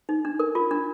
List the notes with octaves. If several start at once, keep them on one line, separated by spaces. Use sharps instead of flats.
D#4
D4
A#4
F4
D4